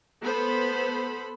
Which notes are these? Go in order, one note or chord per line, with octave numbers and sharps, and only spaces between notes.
B3 A4 C5 B5